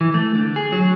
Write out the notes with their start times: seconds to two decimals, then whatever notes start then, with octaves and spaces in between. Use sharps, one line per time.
0.01 E3
0.14 A3
0.35 D3
0.56 G#4
0.72 F#3